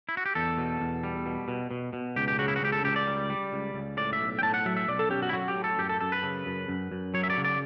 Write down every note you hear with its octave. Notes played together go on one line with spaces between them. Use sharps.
E4
F#4
G4
E2 A4
B2
E2
G3
B2
B2
B2
B2
C#2 G4
G4
C#3 F#4
E4
F#4
C#2 G4
A4
C#2 G4
D5
G3
G3
C#2
C#2
A2 D5
E5
B1
G5
A2 A5
F#5
F#3 E5
E5
B1 D5
A4
C#4 G4
F#4
E4
F#3 F#4
G4
A2
A4
F#2 G4
A4
F#2 A4
B4
C#3
F#2
F#2
F#2
F#3 C#5
E5
D5
C#3
D5